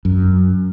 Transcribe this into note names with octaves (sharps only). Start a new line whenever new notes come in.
F#2